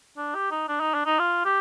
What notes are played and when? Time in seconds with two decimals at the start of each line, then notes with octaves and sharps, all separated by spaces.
0.17 D4
0.35 G4
0.51 D#4
0.68 D4
0.81 D#4
0.94 D4
1.06 D#4
1.19 F4
1.45 G4